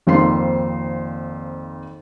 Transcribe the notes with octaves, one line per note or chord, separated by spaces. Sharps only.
G#1 F2 A#3 C4 C6 C7